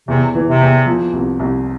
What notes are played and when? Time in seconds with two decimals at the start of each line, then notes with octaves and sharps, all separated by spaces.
0.08 E2 C3
0.35 E3
0.47 C3
0.61 E2
0.86 F3
1.13 C2
1.40 C2